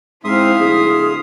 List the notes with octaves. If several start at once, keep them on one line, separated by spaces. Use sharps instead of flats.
G#2 C4 E4 E5 F5 C6 D#6
D1 G#4